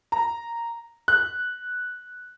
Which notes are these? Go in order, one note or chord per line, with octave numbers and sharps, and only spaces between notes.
A#5
F#6